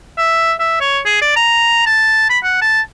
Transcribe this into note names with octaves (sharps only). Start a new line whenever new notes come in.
E5
E5
C#5
G#4
D5
A#5
A5
B5
F#5
A5